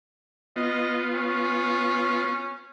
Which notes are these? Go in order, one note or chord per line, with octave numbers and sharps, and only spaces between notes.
B3 F4 D#5
C#4